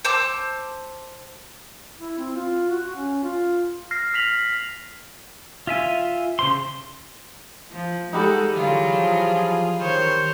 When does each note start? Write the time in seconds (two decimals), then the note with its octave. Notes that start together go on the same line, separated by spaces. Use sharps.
0.05 C5 A5 D6 E6
1.99 E4
2.18 C4
2.36 F4
2.70 F#4
2.96 C#4
3.24 F4
3.91 F6 A#6 C7
4.14 F6 B6 F7 F#7
5.67 F4 E5 G#5
6.39 C#3 C5 C6
7.71 F3
8.13 G3 G#3 D#4 F#4 A4
8.55 D3 E3 F#3 F4 G#4
8.89 F3
9.80 D#3 C5 C#5